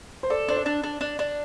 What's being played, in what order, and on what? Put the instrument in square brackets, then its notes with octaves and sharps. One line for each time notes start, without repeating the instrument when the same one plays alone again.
[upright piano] C5
[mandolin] A4 [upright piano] D5
[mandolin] D4 [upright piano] C5
[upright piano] D5
[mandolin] D4
D4
D4
D4